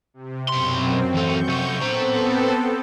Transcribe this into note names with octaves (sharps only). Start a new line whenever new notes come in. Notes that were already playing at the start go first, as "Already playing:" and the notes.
C3
B1 F#2 C4 C6
E3 A4 C#6 G6
C3 A4
B3 C4 A4 C5 A#5